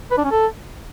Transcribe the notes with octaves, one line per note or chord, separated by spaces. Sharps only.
B4
D4
C#4
A4